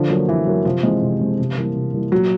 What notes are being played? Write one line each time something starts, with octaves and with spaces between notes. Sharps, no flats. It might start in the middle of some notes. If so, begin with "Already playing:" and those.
Already playing: D3 F3
F#3 A#3
D3 E3
F#3 A#3
C3 F3
E3 G#3 C4
C3
E3 G#3 C4
C3
E3 G3 A#3
C3
E3 G3 A#3
A#2 F#3